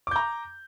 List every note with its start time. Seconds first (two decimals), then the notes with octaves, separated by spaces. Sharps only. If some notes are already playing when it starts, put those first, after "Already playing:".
0.07 D6
0.11 G6
0.16 A#5